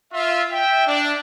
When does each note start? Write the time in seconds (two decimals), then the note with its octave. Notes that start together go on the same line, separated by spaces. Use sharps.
0.13 F4 E5
0.51 E5 G5
0.87 D4